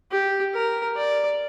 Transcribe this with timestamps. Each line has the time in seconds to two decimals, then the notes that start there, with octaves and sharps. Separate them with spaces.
0.11 G4
0.54 A#4
0.96 D5